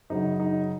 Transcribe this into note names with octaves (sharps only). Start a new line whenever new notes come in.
F#2 C#3 F#3 D#4
D#4